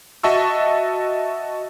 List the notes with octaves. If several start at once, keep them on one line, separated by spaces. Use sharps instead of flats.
F#4 D#5 E5 A5 C#6 E6